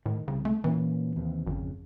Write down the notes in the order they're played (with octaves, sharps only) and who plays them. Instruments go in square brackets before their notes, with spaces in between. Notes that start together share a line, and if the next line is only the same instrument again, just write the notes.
[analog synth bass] A2 [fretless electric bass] D#3
[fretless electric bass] C2 [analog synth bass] C#3
[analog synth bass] A3
[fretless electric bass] A#2 A#3 C#4 [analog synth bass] E3
[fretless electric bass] D#2 C3
[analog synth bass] G#1 [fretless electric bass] F2 C#3